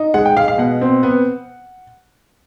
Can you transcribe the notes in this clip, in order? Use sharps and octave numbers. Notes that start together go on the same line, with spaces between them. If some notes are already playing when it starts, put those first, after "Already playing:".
Already playing: D#4
G#3 F#5
G5
G#3 F5
F5
B2 F#5
C4
B3